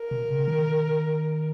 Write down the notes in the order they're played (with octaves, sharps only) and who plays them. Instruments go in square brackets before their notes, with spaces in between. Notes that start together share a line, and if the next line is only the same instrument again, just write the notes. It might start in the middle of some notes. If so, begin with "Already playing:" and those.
Already playing: [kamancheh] A#4
[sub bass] B2
C#3
D#3